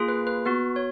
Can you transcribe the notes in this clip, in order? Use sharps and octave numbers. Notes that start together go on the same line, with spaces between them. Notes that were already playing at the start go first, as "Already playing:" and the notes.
Already playing: A#3 F4 G#4
B4
B4
B3 F#4 B4
C#5